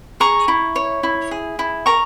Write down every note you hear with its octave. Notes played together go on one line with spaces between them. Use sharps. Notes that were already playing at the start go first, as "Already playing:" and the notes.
G#4 A#5 C#6
E4
C#5
E4
G#4
E4
A#4 A#5 C#6